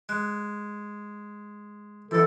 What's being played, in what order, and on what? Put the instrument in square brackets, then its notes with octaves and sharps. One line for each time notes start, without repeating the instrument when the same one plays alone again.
[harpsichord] G#3 [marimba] F#6
[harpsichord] F#2 B2 [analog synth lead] E3 [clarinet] A4